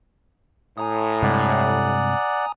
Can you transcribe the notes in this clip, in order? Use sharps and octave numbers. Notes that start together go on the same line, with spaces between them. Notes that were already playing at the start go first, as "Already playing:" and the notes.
A2 G#5 A#5 D#6
G2 C3 G#3 D5 F#5